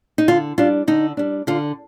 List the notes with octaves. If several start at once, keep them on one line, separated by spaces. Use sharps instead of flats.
D#4
D3 F4
G3 D4 F4
D3 D#4
G3 D4
D3 F4